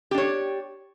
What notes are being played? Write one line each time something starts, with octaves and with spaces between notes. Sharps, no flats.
D4 G4 C#5